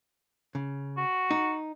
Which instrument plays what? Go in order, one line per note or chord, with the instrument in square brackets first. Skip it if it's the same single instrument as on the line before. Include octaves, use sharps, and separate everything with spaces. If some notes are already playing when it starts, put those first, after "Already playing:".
[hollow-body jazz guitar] C#3
[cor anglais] F#4
[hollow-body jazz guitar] D#4